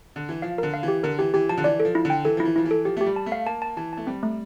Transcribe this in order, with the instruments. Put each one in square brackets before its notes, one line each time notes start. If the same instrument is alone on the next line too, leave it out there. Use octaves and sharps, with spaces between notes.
[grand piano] D3
E3
[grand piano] F3 [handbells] F5
[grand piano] D3 [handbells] A#4
[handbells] F5
[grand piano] E3
[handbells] G4
[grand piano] D3 [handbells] A#4
[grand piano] E3 [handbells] G4
[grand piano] E3 [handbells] G4
[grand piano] F3 [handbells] A5
[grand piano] D3
[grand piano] E3 [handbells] D5
[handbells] A4
[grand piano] F3
[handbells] E4
[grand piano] D3
[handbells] G5
[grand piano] E3 [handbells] A4
[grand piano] F3 [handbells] E4
[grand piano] E3
[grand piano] F3 [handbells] E4
[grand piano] E3
[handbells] A4
[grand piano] F3 [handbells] G4
[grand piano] A3 [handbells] G4
[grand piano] G3
[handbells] A5
[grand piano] A3
[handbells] F5
[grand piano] A#3 [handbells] A5
[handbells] A5
[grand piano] E3 [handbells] A5
[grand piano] A3 [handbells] A5
[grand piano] G3 [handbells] C4
[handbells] A3